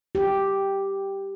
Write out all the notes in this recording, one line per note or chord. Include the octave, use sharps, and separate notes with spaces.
G4